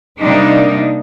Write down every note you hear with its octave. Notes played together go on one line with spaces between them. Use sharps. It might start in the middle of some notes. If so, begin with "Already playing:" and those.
C3 G3 A#3 D4 D#4